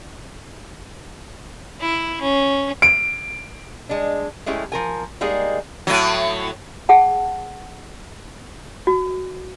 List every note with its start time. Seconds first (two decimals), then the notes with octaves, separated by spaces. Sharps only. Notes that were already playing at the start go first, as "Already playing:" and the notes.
1.80 E4
2.21 C#4
2.82 D7
3.89 G#3 D4
4.46 G#3 A3 C#4 E4 G4
4.72 F3 A#4 G#5
5.21 G3 G#3 A#3 D#4 G#4
5.87 A2 F#3
6.89 G#4 F#5 A5
8.87 F#4